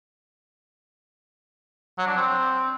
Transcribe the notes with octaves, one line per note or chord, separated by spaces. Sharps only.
F#3
D4
C4